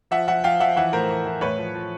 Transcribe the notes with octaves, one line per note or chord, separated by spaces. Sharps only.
F3 E5 F#5
F3 E5 F#5
F3 F5 G5
F3 E5 F#5
E3 E5 F#5
A2 A#4 C5
E3
E3
A2 B4 C#5
F3
F3